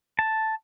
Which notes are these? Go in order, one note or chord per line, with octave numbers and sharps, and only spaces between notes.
A5